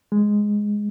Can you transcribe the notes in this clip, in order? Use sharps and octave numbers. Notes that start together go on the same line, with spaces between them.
G#3